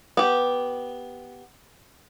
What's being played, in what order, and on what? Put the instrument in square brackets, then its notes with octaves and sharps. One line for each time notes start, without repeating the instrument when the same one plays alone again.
[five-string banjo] B3 G4